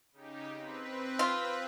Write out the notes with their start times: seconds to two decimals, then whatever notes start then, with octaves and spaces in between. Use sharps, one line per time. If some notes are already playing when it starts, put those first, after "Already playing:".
0.12 C#3 D#4 G4
0.53 C4 B4
1.19 F4